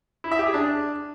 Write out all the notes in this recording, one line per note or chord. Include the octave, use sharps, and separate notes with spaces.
E4
E5
G4
G#4
D4